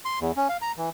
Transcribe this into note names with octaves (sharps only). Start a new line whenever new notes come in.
C6
E2
C#4
F5
A#5
E3